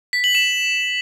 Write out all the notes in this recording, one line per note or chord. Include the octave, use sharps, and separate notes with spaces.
B6
F#7
E7